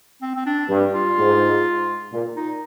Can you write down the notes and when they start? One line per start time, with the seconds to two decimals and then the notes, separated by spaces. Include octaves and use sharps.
0.22 C4
0.36 C4
0.46 D4
0.69 G2
0.94 F4
1.18 G#2
2.12 A#2
2.36 D#4